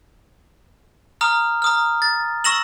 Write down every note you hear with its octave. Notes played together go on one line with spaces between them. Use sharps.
A#5 D#6 F6
A#5 D#6 F6
A6
C#6 E6 A#6 E7 F#7